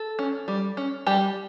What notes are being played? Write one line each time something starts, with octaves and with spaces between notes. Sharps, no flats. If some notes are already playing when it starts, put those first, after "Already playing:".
Already playing: A4
C#4
G3
C#4
G3 G4